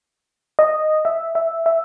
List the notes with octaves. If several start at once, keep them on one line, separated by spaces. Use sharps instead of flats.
D#5
E5
E5
E5